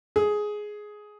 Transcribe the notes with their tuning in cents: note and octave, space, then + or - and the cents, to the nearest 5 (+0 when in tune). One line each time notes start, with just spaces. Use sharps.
G#4 +10